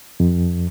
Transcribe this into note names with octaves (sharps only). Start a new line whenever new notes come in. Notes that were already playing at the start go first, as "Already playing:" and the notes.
F2